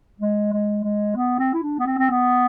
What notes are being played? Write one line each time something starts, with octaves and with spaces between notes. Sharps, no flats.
G#3
G#3
G#3
B3
C4
E4
D4
B3
C4
C4
B3